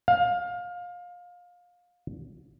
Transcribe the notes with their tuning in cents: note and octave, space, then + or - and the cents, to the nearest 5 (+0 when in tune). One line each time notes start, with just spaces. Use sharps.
F5 +25